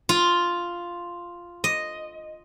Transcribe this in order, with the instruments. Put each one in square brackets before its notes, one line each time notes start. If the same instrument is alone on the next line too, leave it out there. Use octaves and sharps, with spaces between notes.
[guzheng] F4
D#5